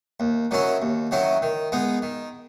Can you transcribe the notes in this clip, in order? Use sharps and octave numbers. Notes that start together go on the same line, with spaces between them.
D#2
D#3 F#3 C#4 E4
D#2
D#3 F#3 C#4 E4
D#3
G#3 B3 D#4
D#3